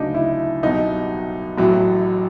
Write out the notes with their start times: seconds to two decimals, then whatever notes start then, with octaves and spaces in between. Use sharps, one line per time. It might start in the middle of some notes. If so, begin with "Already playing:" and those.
Already playing: D2 C#3 F#3 D4 D#4
0.14 E4
0.63 C2 B2 F#3 D#4
1.58 A1 A2 F#3